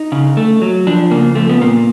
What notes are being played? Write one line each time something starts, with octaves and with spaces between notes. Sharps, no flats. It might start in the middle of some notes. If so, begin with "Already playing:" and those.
Already playing: D#4
C#3
A3
F#3
F3 D4
C#3 A#3
F3 A3
B3
A#2 A#3